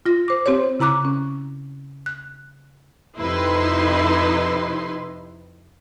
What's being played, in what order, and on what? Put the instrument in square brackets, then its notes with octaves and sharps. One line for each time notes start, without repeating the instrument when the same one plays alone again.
[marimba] F4 A#6
C5 D6
C4 G4 C5 C#5
C#3 E4 A#5 D6 F#6
C#4
F#6
[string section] F2 C3 D#4 E4 B4 C6